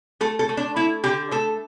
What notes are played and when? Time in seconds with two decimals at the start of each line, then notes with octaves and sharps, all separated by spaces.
0.21 A3 A4
0.39 A4
0.49 A3
0.57 D4
0.76 A3 E4
1.04 D3 G4
1.31 A3 A4